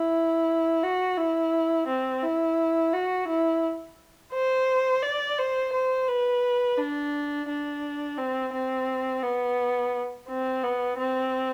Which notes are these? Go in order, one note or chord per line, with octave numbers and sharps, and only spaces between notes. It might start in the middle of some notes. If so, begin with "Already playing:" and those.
Already playing: E4
F#4
E4
C4
E4
F#4
E4
C5
D5
C5
C5
B4
D4
D4
C4
C4
B3
C4
B3
C4